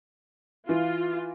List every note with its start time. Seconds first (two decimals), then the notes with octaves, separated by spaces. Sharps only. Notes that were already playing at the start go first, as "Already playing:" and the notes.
0.69 E3 F4